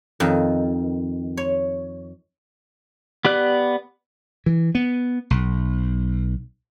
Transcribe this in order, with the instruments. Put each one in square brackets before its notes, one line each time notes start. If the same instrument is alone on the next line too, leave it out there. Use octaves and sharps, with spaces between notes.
[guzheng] F2 D#3
C#5
[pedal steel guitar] B3 G4 D5 F#6
[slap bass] E3
B3
B1